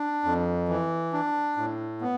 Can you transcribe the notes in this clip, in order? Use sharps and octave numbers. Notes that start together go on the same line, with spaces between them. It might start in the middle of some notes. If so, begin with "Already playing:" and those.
Already playing: D4
F2
E3
D4
A2
B3